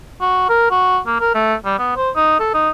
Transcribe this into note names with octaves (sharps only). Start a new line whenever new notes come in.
F#4
A#4
F#4
A#3
A#4
A3
G3
B3
C5
D#4
A4
D#4